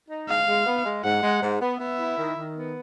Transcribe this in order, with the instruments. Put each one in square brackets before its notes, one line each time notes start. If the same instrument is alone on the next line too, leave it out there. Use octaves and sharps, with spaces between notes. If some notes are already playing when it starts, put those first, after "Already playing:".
[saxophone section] D#4
[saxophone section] G#3 [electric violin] F5
[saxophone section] G#3
B3
G#3
[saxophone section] G#2 [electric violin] F#5
[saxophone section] G#3
G#2
B3
[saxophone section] B3 [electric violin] E5
[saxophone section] E4
D#3
D#3
B3